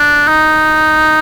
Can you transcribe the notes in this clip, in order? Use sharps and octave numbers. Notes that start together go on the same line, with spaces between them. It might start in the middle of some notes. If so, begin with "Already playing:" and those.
Already playing: D4
D#4